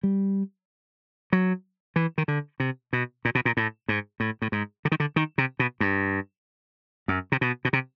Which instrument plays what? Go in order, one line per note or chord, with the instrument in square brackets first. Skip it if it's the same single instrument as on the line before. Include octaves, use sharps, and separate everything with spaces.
[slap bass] G3
F#3
E3
D#3
D3
C3
B2
A#2
B2
A#2
A2
G#2
A2
A2
G#2
D3
D#3
D3
D#3
C3
B2
G2
F#2
C3
B2
B2
C3